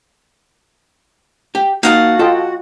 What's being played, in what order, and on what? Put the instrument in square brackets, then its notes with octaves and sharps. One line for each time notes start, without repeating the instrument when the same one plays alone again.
[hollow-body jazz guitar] G4 G5
[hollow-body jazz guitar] A#3 D#4 [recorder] F#4 [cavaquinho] F5 F#5 A5
[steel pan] F4 D#5 G5 [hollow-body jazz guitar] A4